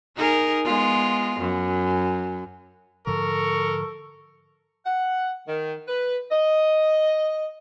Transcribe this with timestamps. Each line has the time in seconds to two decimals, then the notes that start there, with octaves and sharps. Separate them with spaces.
0.16 D#4 G#4 A#4
0.65 G#3 B3 F4
1.40 F#2
3.07 G#2 D3 F3 A4 A#4 C#6
4.86 F#5
5.47 D#3
5.88 B4
6.31 D#5